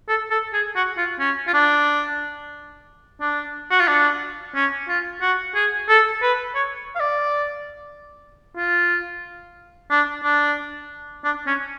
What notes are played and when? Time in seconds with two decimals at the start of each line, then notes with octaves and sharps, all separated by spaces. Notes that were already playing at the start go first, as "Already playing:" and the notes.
0.08 A4
0.31 A4
0.53 G#4
0.76 F#4
0.98 F4
1.20 C#4
1.47 F4
1.54 D4
3.21 D4
3.71 F#4
3.80 F4
3.88 D4
4.55 C#4
4.89 F4
5.21 F#4
5.55 G#4
5.89 A4
6.22 B4
6.55 C#5
6.95 F5
7.00 D5
8.57 F4
9.91 D4
10.24 D4
11.25 D4
11.47 C#4